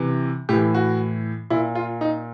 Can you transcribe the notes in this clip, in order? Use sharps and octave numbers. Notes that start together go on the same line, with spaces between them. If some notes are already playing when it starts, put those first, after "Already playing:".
Already playing: C3 E3
A2 E3 G4
F#4
A#2 E4
F4
D#4